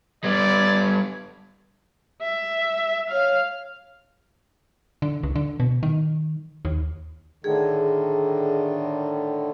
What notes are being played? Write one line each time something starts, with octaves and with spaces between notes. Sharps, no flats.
G3 B3 D5 G#6
E5
C#5 F5
D3
C#2
D3
B2
D#3
D#2
A2 D3 D#3 G#4